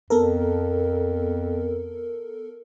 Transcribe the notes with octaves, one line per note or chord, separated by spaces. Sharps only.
F2 B3 A4 A#4